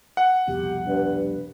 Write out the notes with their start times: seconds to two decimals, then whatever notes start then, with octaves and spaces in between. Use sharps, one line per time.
0.17 F#5
0.47 C2 F2 B2 G4
0.86 G2 B4